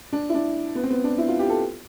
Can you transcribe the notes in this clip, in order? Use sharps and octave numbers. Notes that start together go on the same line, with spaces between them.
D4
E4
D4
B3
C4
B3
D4
E4
F4
G4
A4